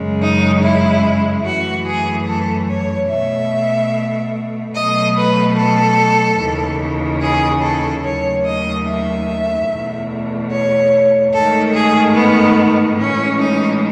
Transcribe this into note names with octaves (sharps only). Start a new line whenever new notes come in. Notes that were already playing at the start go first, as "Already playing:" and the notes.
Already playing: F#2 C#3 G#3
D#4
E4
F#2 E3 A3 F#4
G#4
A4
C#5
B2 A3 E5
B2 F#3 A3 D#5
B4
A4
D#2 C#3 E3
G#4
A4
D#2 C#3 F#3 A3 C#5
D#5
E5
E2 B2 A3
C#5
G#2 D#3 A3 A4
G#4
B3
A2 E3 G#3 C#4
D#4